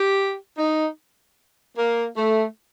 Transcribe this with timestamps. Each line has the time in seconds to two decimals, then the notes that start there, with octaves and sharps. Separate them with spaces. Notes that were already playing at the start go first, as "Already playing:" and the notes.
Already playing: G4
0.58 D#4
1.78 A#3
2.17 A3